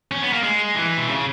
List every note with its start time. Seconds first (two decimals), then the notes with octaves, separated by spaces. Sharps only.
0.11 C#4
0.22 B3
0.33 A#3
0.44 G#3
0.75 E3
0.97 B2
1.08 C#3